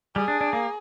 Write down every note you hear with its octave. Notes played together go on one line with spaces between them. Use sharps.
G3 G#4
D4
D4
A#3